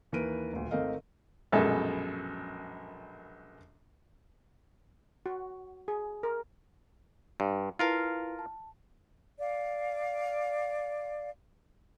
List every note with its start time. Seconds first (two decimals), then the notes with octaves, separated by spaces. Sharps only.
0.12 D#2 E3 A#4 B4 D7 D#7
0.53 D#1 D2
0.71 G#1 A3 C4 A#4 D#5 F5
1.52 A#1 F#2 B2 G#3 A4 E5
5.26 F#4
5.88 G#4
6.23 A#4
7.40 G2
7.79 E4 F4 A#4 B4 F5 A5
8.39 A5
9.39 D5 F5